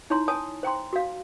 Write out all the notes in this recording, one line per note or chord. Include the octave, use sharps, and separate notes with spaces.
D#4 E4 C#5 A#5 C6
C#5 G#5 A5 D#6
C5 G5 A#5 C6
F#4 F5